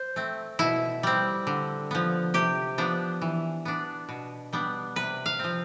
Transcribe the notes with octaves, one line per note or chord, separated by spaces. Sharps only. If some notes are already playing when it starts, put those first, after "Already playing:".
Already playing: C5
A3 C4
B2 E4
G3 C4
D3
F3 B3
C3 G4
F3 B3 D4
E3
B3 D4
B2
G3 B3 D4
C3 B4
F5
F3 C4